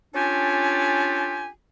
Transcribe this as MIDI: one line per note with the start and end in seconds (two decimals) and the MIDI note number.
0.14 1.48 61
0.14 1.48 62
0.14 1.48 65
0.14 1.48 67
0.14 1.48 69
0.14 1.48 80